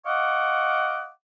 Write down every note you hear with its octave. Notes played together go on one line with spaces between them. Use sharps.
D#5 F5 F#5 C#6 D6